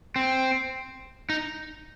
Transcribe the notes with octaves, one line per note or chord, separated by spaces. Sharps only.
C4
D#4